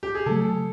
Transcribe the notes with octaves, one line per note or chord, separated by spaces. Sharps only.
G4
G#4
C#3 F#3 A3 A4